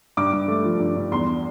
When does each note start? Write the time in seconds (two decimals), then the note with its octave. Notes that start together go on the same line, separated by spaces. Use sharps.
0.17 G2 D6
0.33 G2
0.48 A3
0.64 F3
0.80 G2
0.96 G2
1.11 E2 C6